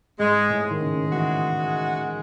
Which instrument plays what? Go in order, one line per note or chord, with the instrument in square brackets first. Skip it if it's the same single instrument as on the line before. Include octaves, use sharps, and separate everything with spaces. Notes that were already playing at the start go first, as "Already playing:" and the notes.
[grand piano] G#2 [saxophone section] G#3
[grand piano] A2
[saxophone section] G#3
[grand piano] D#3
C#3
D#3
[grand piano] E3 [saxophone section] F#4
[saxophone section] G#3
[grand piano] D#3